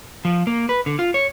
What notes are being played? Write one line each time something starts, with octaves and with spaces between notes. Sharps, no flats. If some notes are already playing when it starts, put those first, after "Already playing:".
F3
A#3
B4
D3
F4
C#5